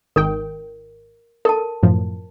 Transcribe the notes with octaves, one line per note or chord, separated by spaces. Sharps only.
G#1 D#3 A#4 G5
A4 A#4 A5
F#2 A2 F3